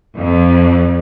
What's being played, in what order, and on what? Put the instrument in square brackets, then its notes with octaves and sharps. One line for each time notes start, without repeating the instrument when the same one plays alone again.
[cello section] F2